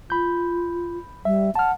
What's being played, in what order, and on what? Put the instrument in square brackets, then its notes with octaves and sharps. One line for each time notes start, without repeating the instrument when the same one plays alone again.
[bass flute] F4 [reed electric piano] B5 G6
[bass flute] G3 [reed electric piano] E5
[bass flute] F#5 [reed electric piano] A5 F6